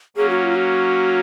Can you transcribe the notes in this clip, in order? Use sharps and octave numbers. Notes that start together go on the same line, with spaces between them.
F#3 A#3 C#4 G#4
F#4
F4
F#4